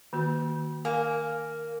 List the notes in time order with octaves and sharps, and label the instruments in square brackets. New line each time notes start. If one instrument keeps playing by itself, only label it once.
[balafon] D#3 A#3 F#4
[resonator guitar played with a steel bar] A#3 [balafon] G#5